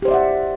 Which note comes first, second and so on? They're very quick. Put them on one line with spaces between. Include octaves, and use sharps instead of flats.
G4 C5 D5 E5 F#5